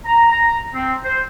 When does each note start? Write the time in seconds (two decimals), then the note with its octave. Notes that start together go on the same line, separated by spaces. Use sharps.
0.05 A#5
0.31 A#5
0.74 C4
1.04 C5